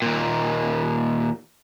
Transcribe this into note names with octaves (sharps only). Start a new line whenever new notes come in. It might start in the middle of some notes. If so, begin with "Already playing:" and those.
D#2 A#2